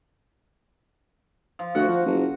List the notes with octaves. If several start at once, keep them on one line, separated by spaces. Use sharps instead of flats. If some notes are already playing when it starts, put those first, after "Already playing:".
F3
D2 F#4 F#5
F3
F#1